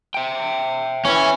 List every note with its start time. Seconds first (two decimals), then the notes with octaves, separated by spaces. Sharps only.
0.14 E5 G5
1.05 E3 C#4